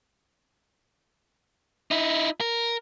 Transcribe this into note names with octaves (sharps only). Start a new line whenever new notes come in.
D#4 E4
A#4